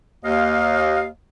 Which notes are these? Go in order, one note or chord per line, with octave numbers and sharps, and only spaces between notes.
D#2 D#5 F5